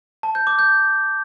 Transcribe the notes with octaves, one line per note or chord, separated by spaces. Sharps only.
A5
G6
D6
G6